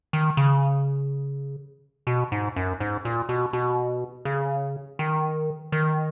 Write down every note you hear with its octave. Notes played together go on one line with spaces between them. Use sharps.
D#3
C#3
B2
G#2
F#2
G#2
A#2
B2
B2
C#3
D#3
D#3